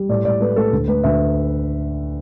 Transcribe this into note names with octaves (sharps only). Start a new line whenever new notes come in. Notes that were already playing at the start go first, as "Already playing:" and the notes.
Already playing: G3
A2 D5
A2 D5
A3 B4
A3 A4
D2
A3 B4
D2 E5